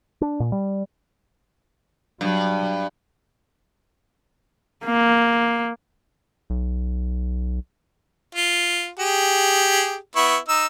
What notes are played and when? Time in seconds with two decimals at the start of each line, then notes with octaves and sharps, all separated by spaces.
0.21 D4
0.40 A#2
0.52 G3
2.21 G2 F#3
4.85 A#3
6.50 B1
8.35 F4
9.00 G4 G#4
10.16 B3 E4 C#6
10.49 D#4 E6